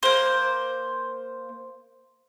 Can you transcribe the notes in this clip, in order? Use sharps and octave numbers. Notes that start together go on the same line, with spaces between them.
A#3 C5